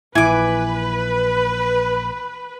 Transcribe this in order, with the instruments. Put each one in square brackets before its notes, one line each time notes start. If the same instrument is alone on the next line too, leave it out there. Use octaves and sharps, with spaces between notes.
[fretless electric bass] A#1 A#2 [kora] E3 [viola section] B4 [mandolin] G#5 D6